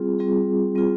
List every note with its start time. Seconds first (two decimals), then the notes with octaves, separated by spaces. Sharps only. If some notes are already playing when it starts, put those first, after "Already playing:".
Already playing: G3 C4 F4 G#4
0.19 G3 C4 F4 G#4
0.75 G3 C4 F4 G#4